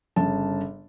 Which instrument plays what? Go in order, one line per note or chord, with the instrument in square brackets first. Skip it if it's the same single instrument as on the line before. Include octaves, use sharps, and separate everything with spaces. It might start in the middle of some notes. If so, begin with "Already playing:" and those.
[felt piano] G1 C#3 A5